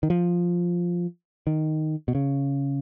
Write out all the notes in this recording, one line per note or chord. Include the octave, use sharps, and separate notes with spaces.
D#3
F3
D#3
B2
C#3